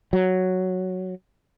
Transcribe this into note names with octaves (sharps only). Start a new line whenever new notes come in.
F#3